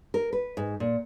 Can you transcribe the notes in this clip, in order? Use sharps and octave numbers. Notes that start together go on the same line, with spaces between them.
A#4
B4
G#2
A#2